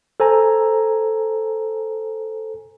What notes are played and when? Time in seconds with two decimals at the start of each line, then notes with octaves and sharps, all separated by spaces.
0.20 A4 C5 G#5 A#5